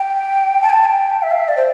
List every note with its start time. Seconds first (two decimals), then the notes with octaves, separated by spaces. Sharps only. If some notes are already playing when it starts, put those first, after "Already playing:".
Already playing: G5
0.62 A5
0.70 G5
0.73 A5
0.85 G5
1.22 E5
1.31 F5
1.39 E5
1.48 D5
1.57 C5